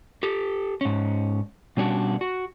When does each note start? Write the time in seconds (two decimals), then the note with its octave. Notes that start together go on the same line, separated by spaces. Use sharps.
0.23 G4 A4
0.81 G#2 C#4
1.77 B2 G3 C#4 D4 F#4
2.21 F#4